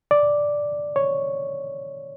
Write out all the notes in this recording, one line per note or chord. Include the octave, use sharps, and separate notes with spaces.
D5
C#5